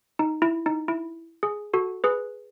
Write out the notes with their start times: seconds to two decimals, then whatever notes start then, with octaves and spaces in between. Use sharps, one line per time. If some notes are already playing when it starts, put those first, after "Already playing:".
0.19 D#4
0.42 E4
0.66 D#4
0.88 E4
1.43 G#4
1.74 F#4 A4
2.04 G#4 B4